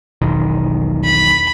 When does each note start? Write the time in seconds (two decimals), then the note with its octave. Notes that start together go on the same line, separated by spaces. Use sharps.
0.22 E1 B1 D#3
1.05 B5